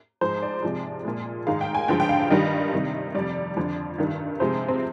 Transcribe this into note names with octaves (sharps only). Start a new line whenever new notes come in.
G#2 F3 G#3 C5
D5
C3 F3 G#3
A#2 G#3
G#2 D#3 G#3 F5
G5
G#5
G2 D3 F3 G#3 G5
G5
F5
F5
G2 D#3 G3 D#5
C3 D#3 G3
F2 C3 G3 D5
F2 D3 F3
G2 D#3 G3
C3 F3 G#3 C5
C4